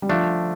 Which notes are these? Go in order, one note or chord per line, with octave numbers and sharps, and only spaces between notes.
G3
D3 F3 A3 D4